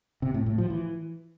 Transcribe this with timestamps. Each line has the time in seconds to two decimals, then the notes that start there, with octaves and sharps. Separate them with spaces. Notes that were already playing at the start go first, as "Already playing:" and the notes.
0.22 C3
0.34 A2
0.46 A2
0.58 F3
0.70 E3